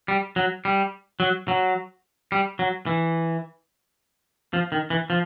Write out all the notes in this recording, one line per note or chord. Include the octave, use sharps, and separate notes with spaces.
G3
F#3
G3
F#3
F#3
G3
F#3
E3
F3
D#3
E3
F3